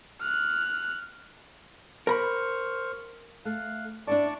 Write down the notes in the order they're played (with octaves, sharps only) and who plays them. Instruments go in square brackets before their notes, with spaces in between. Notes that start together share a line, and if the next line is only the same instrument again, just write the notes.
[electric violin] F6 F#6
[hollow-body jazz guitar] A#4 A#5 B5 [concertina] C5 C#6 F6
[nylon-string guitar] A3 [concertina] F5 F#6
[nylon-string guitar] D4 E4 D5 [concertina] A5 C#6 D6